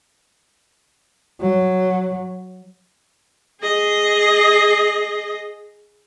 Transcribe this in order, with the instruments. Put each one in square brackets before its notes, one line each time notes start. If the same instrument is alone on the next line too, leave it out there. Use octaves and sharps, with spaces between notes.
[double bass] F#3
[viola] G#4 D#5